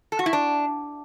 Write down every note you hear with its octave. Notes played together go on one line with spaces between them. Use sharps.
A4
F#4
E4
D4